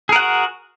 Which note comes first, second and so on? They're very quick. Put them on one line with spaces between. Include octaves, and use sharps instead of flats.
G#4 A#4 F#5 F#4